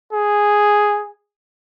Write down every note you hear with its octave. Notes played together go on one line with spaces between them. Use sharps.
G#4